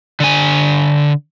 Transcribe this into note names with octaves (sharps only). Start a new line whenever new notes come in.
D3 G#5